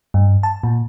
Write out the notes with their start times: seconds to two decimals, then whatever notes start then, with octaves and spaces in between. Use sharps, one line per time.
0.14 G2
0.43 A5
0.63 A#2